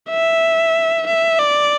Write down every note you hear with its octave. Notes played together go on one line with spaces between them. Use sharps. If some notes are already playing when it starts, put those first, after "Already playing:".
E5
E5
D5